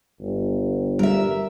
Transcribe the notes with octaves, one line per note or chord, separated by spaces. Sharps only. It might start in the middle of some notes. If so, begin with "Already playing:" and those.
G1
G3 A#4 E5